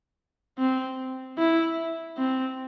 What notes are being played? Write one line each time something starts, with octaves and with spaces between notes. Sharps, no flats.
C4
E4
C4